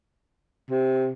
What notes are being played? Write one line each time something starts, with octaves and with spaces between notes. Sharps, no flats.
C3